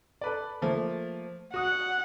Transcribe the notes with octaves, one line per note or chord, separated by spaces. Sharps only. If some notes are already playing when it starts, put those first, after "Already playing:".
A4 B4 D5
F3 A3 A#3
F#4 F#5 D#6